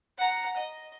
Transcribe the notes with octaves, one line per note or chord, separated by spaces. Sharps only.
F#5 A#5
D#5